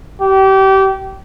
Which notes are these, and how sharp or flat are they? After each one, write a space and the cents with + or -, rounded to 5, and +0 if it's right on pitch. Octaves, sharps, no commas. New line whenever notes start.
G4 -30